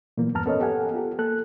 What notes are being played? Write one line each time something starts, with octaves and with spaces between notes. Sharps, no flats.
A#2 E3 F#3 A#3 B3
E2 G2 B3 A5 A#5 F6
B3 C#4 A4 A#4 C#5 D#5
B3 G4 A4 F#5 G#5
F4 G4 A4
A#3 A4 F#6